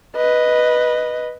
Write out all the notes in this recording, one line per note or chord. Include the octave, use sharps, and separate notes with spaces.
B4 D#5